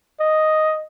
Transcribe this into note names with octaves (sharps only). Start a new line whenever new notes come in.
D#5